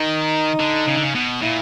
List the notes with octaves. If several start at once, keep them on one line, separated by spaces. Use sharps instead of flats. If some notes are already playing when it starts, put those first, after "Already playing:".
Already playing: D#3 D#4
D3
C#3
D3
C#3
B2
A#2 E4